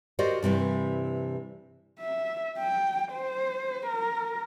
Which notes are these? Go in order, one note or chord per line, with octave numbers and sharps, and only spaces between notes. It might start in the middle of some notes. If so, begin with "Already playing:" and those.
F#4 G4 A#4 C5 D5 D#5
G2 C3 E3 G3
E5
G5
C5
A#4